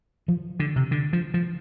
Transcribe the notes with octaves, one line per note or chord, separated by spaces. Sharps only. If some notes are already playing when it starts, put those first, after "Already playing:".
F3
D3
C3
D3
F3
F3